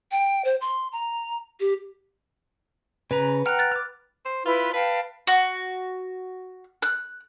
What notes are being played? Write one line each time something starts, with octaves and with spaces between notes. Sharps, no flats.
G5
C5
C6
A#5
G4
C#3 B4 A#5
F#5 G5 A#5 F6 F#6
F#6 A6
D6 F6
C5
E4 F4 B4
B4 F5 G5 A5
F#4
F#6